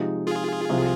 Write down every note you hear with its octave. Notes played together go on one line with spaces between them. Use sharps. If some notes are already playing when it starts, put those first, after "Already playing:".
Already playing: C3 F3 G#3 D#4
F4 G#4
C2 C3 F3